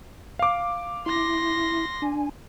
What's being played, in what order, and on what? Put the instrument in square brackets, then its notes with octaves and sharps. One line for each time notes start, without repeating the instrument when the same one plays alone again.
[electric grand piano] F5 D6
[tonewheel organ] E4 [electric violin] C6 A#6
[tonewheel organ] D4 G#5